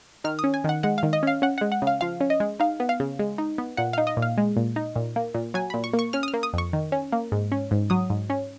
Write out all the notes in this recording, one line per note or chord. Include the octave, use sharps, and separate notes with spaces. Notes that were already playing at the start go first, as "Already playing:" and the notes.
D#3 F6
D#6
C#4
G#5
D#3 F#5
G#3 F#5
F5
D#3
D#5
C#4 F5
C#4 F#5
G#3 F#5
F#5
C#3
F5
F3 F5
C#4
D#5
G#3
D#4 F5
B3
F5
C#3
G#3
D#4
B3
A#2 F#5
D#4 F5
D#5
A#2
F5
G#3
A#2
D#4
A#2
A#3
A#2
F#3 G#5
A#2 B5
C#6
A#3
C#6
C#4 F6
D#6
F6
A#3
D#6
F2 C#6
D#3
C#4
A#3
G#2
C#4
G#2
F#3 D#6
G#2
C#4